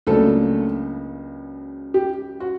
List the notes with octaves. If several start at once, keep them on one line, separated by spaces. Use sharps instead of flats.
C#2 C#3 F#3 A3 A#3 D4 A4
G4
F#4